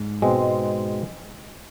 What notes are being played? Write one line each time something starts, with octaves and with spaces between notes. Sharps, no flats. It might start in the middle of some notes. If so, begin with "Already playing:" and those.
Already playing: G#2
B2 G#3 C4